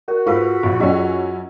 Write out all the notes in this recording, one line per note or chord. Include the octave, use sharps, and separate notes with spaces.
F#4 A#4
G#2 F4 G#4 B4 F5 B6
A#1
F#2 C#4 F4 G#4 D#5